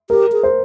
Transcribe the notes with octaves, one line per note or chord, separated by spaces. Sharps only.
G4 A#4
G#4
C5